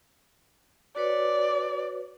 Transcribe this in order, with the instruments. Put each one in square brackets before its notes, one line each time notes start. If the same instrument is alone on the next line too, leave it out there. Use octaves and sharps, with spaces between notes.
[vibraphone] F#4 B4 C#5 [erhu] D5